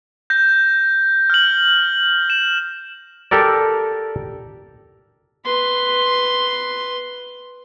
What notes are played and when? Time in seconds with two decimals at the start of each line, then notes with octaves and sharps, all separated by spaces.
0.30 G6 A#6
1.30 F6 F#7
2.30 E7
3.31 G4 A4 A#4 D5
5.45 B4 C6